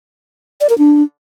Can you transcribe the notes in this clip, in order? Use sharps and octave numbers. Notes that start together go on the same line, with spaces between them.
D5
A#4
D4